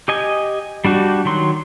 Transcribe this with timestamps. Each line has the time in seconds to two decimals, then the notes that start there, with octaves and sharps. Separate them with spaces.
0.08 G4 D#5 G#5
0.85 G3 D4 F#4 G4
1.25 D#3 F#3 C6